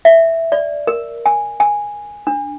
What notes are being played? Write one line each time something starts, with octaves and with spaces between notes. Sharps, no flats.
E5
D5
A#4
G#5
G#5
D4